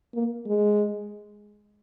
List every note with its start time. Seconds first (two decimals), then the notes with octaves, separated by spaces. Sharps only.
0.14 A#3
0.46 G#3